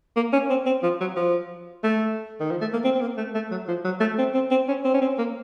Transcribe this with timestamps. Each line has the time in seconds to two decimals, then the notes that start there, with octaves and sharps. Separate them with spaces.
0.16 A#3
0.33 C#4
0.50 C4
0.66 C4
0.83 F3
1.01 F#3
1.16 F3
1.84 A3
2.40 D#3
2.51 F3
2.61 A3
2.73 A#3
2.84 C4
2.95 C4
3.01 A#3
3.17 A3
3.35 A3
3.51 F#3
3.68 F3
3.85 F#3
4.00 A3
4.18 C4
4.35 C4
4.51 C4
4.68 C#4
4.85 C4
4.94 C#4
5.01 C4
5.18 A#3